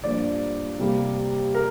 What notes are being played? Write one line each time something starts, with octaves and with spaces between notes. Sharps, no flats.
G2 F3 A#3 D5
C3 G3 A#3
A#4